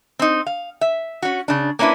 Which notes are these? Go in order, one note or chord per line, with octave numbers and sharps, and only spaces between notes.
C4 D#4
F5
E5
C#4 F#4
C#3 D4
A#3 C#4 D4 E4 B4